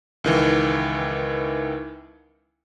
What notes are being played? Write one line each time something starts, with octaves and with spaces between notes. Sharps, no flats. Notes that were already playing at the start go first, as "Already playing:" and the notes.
C#2 D#3 E3